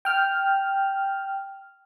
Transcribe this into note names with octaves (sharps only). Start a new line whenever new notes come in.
G5 F6